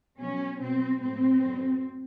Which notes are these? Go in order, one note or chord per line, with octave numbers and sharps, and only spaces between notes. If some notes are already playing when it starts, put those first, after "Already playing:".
B2 F#3 C#4
B2 F#3 C4
A2 F#3 C4
F#2 D3 F#3